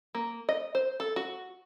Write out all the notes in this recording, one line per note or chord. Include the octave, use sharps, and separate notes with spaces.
A#3
D#5
C5
A4
F#4